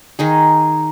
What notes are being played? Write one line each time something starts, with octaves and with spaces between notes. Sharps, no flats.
D#3 D#4 G#4